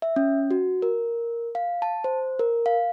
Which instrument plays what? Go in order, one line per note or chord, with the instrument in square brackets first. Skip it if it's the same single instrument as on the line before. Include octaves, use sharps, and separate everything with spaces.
[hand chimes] E5
C#4
F#4
A#4
F5
A5
C5
A#4
F5